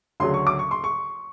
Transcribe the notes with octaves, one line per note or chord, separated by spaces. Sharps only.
D2 C#3 F#3 C6
C#6
D6
C#6
C6
C#6